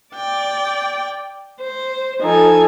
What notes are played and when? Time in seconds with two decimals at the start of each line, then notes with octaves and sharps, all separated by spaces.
0.14 D5 G5
1.61 C5
2.23 F3 D#4 A4 G#5